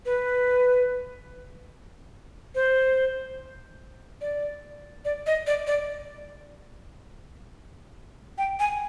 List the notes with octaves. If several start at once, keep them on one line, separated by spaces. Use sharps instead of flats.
B4
C5
D5
D5
D#5
D5
D5
G5
G#5